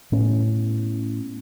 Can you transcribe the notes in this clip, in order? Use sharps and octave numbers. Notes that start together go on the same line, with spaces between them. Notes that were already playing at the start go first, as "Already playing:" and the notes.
A2 B3 C#4